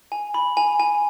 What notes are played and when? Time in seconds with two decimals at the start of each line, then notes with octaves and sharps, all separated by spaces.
0.12 G#5
0.34 B5
0.57 G#5
0.80 G#5